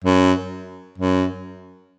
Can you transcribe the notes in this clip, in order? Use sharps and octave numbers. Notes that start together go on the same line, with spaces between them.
F#2
F#2